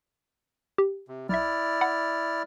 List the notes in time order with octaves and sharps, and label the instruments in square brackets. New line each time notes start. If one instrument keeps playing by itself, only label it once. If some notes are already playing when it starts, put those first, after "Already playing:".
[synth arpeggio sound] G4
[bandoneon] C3
[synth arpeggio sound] B1 E5 [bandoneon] E4 D5 F6
[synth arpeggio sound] F#5 B5